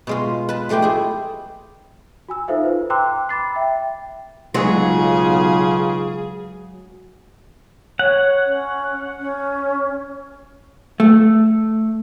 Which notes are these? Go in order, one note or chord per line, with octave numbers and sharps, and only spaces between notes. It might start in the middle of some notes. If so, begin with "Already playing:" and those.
B2 G#3 F4
B4 A5
F3 G#3 A3 G4 G5
E4 G#4
F#4 G#5 E6
D#4 F4 A4 C5 E5 F5
B4 C5
G5 A#5 C6 D6 E6 F#6
B5 D6 A6 C7
E5 G5
B1 C#3 F#3 G#3 F4 G#4
C#5 F#5
C#4
C#4
A3